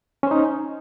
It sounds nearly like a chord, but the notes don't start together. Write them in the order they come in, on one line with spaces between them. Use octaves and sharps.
C#4 C5 D#4